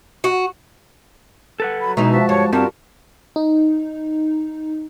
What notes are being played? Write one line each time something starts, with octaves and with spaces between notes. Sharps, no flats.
F#4
A4 B4 F#5
F#3 B5
B2 E3 G#3 D#4 A#5
F3 F#4 E5 A5
G2 C#5
G2 G3 C4 F4 F#4 A#4 A5
D#4